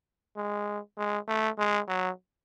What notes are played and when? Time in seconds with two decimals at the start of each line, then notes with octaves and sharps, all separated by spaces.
0.36 G#3
0.97 G#3
1.28 A3
1.58 G#3
1.88 F#3